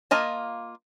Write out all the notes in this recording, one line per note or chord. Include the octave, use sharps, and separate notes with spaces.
A#3 F4 D#5 A5